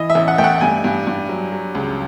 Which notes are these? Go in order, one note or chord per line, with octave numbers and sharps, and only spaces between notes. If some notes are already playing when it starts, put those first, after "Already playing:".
Already playing: E3 D#5
E5
A1
F#5
A3 G5
F#5
G2 G#5
G2
G2
F#3
F#3
C#2